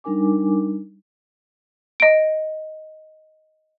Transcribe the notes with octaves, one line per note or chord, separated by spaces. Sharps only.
G3 D4 D#4 A#4 G#5 D6
D#5 D7